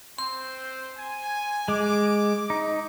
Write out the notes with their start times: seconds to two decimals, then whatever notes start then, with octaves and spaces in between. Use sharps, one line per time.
0.18 C4 C5 C6
0.97 G#5
1.68 G#3 D6
2.50 D#4